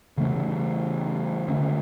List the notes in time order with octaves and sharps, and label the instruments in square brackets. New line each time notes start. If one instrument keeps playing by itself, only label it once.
[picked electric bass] C#3 E3 A3 C#4
D3 A3 C#4